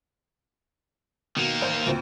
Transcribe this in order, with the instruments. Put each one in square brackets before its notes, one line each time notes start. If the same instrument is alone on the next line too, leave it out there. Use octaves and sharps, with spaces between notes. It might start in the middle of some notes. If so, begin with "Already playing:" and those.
[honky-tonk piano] B2 C#7 [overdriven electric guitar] D#3 A#3
[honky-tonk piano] A1 C5 G6
D2 A#2 C4